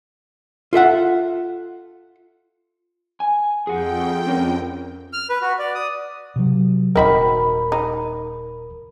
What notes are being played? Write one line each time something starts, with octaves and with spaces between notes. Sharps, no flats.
F4 A4 E5 F#5
G#5
F2 G#4 F#5 G5
C4 C#4 A#4
F6
B4
F#4
D5
D#6
C3 F#3
D#1 C4 D#4 F#4 A#4 B5
D#4